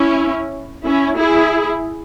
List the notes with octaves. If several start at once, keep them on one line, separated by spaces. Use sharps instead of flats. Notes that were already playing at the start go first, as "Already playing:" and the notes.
Already playing: C#4 E4
C#4 E4
E4 G#4